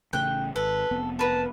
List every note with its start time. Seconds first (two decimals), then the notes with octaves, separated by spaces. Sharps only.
0.13 A1 C#3 A3 G5 F#6
0.56 G#1 A4 B4
0.91 F1 B3 C4
1.19 A#4 B4 F#5 A5